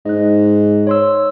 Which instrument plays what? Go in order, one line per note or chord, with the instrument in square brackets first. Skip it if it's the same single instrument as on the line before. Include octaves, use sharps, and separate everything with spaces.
[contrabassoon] G#2 [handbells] D#5 F#6
[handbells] C#5 C6 E6